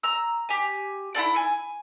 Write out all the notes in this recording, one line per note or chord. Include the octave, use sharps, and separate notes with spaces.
A#5 E6
G4 G#5
E4 F4 A4 D5
G#5